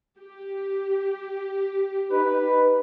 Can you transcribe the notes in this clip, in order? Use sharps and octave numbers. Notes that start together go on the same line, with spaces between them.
G4
D#4 B4